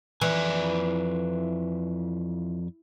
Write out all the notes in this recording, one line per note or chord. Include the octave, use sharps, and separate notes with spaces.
F2 E3 D5 G#5